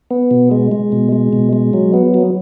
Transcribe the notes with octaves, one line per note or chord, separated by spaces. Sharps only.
B3
B2
G#3
G#3
B2
G#3
B2
G#3
F#3
B3
F#3